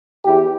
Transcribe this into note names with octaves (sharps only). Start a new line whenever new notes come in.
E2 E4 G4